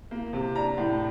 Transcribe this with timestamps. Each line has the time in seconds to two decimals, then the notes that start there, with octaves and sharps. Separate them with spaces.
0.11 A#3
0.33 C3
0.55 D4 A#5
0.78 A2